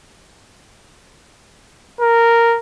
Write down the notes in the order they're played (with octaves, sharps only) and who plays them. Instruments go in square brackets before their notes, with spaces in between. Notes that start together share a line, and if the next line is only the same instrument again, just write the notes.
[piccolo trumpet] A#4